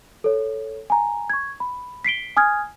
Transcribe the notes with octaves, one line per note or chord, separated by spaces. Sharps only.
A4 C#5
G#5 A#5
C#6 G#6
B5
B6 C7 D7 G7
G#5 D#6 F6 G#6